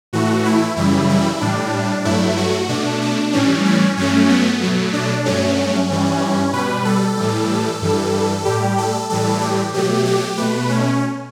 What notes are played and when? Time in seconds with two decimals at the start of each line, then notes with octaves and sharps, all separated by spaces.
0.13 A2 E3 A3 F#4
0.45 E4
0.76 F#2 C#3 E3 G3 E4
1.09 E4
1.41 A2 G3 D4
2.05 G2 F#3 A3 E4
2.37 F#4
2.69 B2 A3 D4
3.02 D4
3.33 A2 E3 G3 C#4
3.65 C#4
3.97 G2 F#3 A3 C#4
4.29 B3
4.61 B2 F#3 A3
4.93 D4
5.25 G2 F#3 A3 C#4
5.90 G2 E3 G3
6.53 B2 G3 B4
6.85 A4
7.17 A2 E3 G3
7.82 G2 E3 G3
8.45 A2 G3 G4
8.78 A4
9.10 A2 E3 G3 A4
9.41 G4
9.73 B2 F#3 A3 G4
10.06 G4
10.38 B2 A3 B4
10.69 C#4